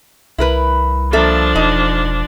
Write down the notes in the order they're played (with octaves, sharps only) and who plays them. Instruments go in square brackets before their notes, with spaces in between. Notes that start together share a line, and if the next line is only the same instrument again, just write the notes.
[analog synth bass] C2 [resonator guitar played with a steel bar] E4 A#4 B4
[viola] F3 D4 [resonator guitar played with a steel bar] A#3 A4 E5
[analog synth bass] E1 [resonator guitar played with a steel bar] D#4